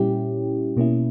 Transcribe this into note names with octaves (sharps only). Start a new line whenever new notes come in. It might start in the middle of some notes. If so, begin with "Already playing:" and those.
Already playing: A#2 G3 C#4 E4 G4
B2 A#3 C#4 E4